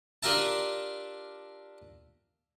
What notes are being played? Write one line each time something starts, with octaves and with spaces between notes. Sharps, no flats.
D4 F4 G4 A#4 E5 A5